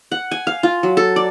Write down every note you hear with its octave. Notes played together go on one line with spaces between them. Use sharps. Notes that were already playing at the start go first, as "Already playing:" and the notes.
F#5
G#5
F5
F4
F#3
A4
D5